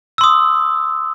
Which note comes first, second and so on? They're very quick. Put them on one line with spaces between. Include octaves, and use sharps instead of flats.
E6 C6 D#6